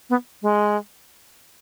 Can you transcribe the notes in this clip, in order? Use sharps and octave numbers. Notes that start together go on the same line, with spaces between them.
B3
G#3